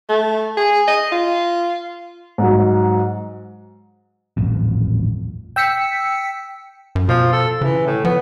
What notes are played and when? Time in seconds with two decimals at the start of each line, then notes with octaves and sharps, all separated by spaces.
0.09 A3
0.57 G#4
0.88 D#5
1.12 F4
2.38 G#2 F#3
4.37 D#1 A1 F2
5.56 G5 E6 B6 C#7
6.95 F#2
7.09 B2 F3
7.32 A4
7.61 C#3 E3
7.86 A2
8.05 F3 B3